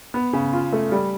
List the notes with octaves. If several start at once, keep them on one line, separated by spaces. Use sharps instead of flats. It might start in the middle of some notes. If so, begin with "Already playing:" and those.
B3
C#3
F4
A3
G3